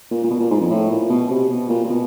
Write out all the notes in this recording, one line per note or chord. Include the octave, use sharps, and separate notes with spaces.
A#2
A#2
B2
A#2
G#2
F2
A2
A#2
B2
C3
B2
A#2
A#2
B2